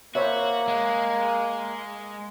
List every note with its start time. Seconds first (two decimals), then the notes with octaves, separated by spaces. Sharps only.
0.15 A#3 F#4 C5 C#5 E5
0.68 G#3